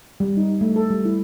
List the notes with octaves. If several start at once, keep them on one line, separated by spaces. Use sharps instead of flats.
G3
D#4
A3
A4
G3
E4